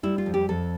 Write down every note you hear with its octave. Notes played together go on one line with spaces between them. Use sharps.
G3 E4
F4
F2
G4
F2 A4